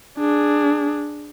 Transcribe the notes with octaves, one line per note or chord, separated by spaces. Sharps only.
D4 G#4